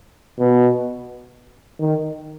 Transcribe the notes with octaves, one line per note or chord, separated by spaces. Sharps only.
B2
D#3